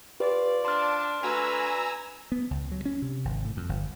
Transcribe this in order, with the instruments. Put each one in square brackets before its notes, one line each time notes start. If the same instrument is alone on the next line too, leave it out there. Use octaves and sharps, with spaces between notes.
[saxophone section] F4 C5 D5 [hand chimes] G4 B4
[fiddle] D4 [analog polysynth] A5 [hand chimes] C6 F6
[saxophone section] A3 D4 F#4 [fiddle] B4 [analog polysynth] G#5 A#5 E6
[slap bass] B3
C#2
F#3
C#4
C3
G#1
A2
F2
G1